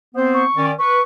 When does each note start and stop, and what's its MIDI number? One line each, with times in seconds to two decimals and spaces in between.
0.15 0.43 59
0.15 0.43 60
0.15 0.43 72
0.34 0.66 85
0.56 0.71 51
0.56 0.71 61
0.56 0.71 74
0.79 0.99 71
0.79 1.02 85